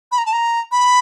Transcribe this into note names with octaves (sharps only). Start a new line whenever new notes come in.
B5
A#5
A5
A#5
B5